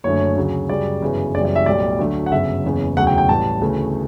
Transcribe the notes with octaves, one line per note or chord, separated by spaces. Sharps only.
F#1 F#2 D3 A3 C#5
D2 C#3 F#3
F#2 C#3 G3 D5
G1 F#2 C#3 E3
F#1 F#2 C#3 E3 G3 D5
D5
E5
B1 A2 G3 D5
D2 D3 F#3 A3
F#5
G1 F#2 C#3 E5
F#1 E2 C#3
E1 D2 C#3 F#3 F#5
G5
G5
A1 A2 G3 A5
D2 C#3 E3 A3